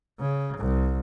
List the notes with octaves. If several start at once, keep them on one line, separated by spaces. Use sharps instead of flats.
C#3
C2